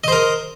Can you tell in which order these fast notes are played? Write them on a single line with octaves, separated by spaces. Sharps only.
D#5 C5 A#4